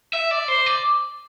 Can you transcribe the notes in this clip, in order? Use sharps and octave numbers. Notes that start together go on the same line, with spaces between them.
E5
D5
C5
D5